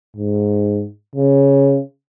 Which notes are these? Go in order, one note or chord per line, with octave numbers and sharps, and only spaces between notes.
G#2
C#3